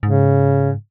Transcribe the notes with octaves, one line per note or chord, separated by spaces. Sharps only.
G#2 C#3